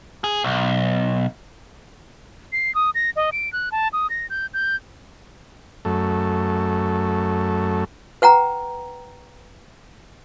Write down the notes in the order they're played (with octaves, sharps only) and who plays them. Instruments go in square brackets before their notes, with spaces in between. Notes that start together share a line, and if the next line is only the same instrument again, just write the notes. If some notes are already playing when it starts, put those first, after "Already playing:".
[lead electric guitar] G#4
B1
[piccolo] C7
D#6
A#6
D#5
D7
F#6
A5
D#6
A#6
G6
G6
[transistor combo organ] F#2 A3
[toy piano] B4 F#5 G5 A#5